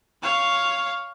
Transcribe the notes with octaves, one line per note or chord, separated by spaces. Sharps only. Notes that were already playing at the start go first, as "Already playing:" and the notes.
C#5 F5